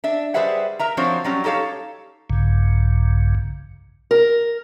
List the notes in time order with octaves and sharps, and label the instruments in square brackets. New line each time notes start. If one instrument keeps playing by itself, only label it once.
[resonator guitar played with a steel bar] D4 E5
G3 G#4 B4 C5 E5 F#5
A#4 E5 A#5
F3 C4 D4 F#4 C5 C#5
F#3 G3 C#4
D#4 G4 A4 C#5 F5
[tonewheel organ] A#1 G2 C#3
[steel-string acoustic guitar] A#4